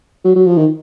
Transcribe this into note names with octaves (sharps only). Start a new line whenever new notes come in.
F#3
F#3
F3
D#3